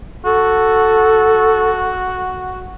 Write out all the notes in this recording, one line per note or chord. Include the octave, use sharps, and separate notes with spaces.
F#4 A4